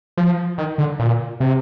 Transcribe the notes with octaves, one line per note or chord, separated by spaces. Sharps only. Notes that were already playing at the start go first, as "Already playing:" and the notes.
F3
D#3
D3
A#2
C3